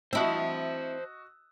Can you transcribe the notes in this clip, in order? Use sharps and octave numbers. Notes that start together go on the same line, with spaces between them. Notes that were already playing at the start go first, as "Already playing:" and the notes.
C4 E4 F#4 C5 D#5 A5 E6